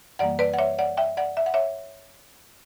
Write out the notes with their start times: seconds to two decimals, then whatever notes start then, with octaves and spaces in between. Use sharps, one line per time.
0.19 F#2 E3 G3 A#3 D5 F#5
0.39 B4 D5
0.54 F#5
0.58 C#5 E5
0.79 D5 F#5
0.97 E5 G5
1.17 D5 F#5
1.37 E5
1.46 F#5
1.54 C#5 E5